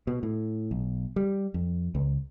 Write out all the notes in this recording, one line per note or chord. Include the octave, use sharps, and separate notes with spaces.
B2
A2
B1
G3
F2
C#2